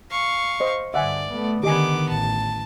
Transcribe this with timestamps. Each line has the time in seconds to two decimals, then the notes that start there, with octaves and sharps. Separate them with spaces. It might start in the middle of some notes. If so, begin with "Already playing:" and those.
0.11 F5 C#6
0.60 C5 D#5
0.94 G2 D3 D5 E5 F#5 G#5
1.31 A3 B3
1.63 D3 D#3 B3 G4 D#5 G#5 D6
2.09 A1 A5